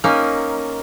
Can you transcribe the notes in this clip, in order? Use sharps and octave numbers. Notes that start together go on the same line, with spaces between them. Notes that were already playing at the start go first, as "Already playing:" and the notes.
A#3 C#4 D#4